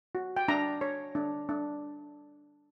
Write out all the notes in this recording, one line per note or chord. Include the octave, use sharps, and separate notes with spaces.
F#4
G5
D4 A#5
C#5
D4
D4